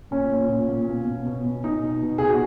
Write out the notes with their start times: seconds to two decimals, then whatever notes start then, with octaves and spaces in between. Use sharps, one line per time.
0.11 A#2 C#4
0.30 A#2
0.49 A#2
0.68 A#2
0.88 B2
1.07 B2
1.26 B2
1.45 B2
1.64 B2 D#4
1.83 B2
2.02 B2
2.18 B2 G#4
2.29 F#4